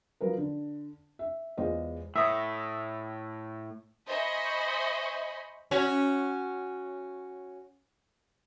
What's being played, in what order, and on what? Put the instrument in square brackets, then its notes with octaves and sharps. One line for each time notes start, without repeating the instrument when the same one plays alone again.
[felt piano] F3 F#3 A#4 B4
D3
E5
E2 G#3 F4 C5 D#5
[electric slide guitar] A2 [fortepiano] E5 D#6
[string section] C5 D#5 E5 G#5 B5 C#6
[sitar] C#4 F#4